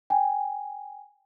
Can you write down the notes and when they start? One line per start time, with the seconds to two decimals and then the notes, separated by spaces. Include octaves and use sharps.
0.10 G5 G#5